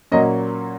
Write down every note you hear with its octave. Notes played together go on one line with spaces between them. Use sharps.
A#2 F#3 A#3 C#4 D#5